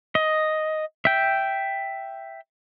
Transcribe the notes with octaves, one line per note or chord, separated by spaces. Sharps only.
D#5
E5 G5